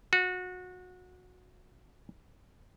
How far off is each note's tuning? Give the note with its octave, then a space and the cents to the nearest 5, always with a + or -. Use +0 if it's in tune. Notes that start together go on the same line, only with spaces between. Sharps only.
F#4 -25